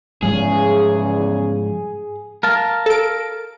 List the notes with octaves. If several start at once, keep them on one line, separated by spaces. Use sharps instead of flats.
E2 G#2 C#3 F3 G3 G#4
A#4 F5 A5
A4 D7